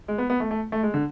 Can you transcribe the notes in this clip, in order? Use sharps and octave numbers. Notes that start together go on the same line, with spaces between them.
G#3
B3
B3
A3
A3
A3
G#3
D3